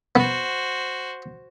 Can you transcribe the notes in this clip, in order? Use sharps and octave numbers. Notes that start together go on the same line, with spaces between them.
B3 F#4 C5